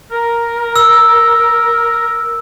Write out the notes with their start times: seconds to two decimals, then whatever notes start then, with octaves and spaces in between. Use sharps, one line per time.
0.12 A#4
0.76 E6